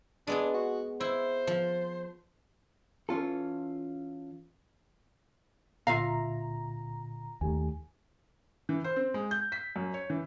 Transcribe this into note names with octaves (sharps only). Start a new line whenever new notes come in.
G#3 B3 D4 G#4
F#4
E4 C5
F3
E3 C#4 F4 A4
C#2 A#2 D3 F4 E5 F5 A#5
D#2 A3 G4 G#5
E3
C5
C4
G#3
G6
B6
F#2
C#5
E3